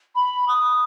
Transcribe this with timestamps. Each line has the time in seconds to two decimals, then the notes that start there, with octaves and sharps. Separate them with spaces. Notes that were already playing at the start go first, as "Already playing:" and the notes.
0.15 B5
0.48 D#6